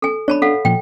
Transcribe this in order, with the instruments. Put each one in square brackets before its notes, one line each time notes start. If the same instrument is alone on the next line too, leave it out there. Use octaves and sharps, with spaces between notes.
[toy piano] A4 G#5
[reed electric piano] D4 [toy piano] C#5 A5 B5
[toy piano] A4 F5 F#5
[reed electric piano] A#2 F3 [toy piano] G5